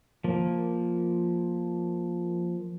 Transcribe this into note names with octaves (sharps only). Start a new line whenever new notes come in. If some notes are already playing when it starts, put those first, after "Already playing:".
F3 A#3